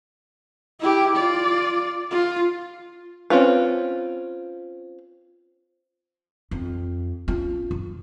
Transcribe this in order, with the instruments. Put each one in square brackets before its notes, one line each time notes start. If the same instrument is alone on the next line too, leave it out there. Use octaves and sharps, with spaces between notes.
[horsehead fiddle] E4 G4
F4 D5
F4
[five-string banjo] C4 C#4 F4 B4
[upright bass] F2
C#4 F4
F#2